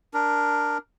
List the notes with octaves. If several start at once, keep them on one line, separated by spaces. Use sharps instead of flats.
D4 A#4